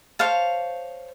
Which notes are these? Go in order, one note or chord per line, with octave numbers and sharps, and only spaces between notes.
C5 C#5 F5 A5